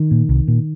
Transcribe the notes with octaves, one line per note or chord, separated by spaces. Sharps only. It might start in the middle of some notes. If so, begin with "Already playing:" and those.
Already playing: D#3
A#2
C2
A#2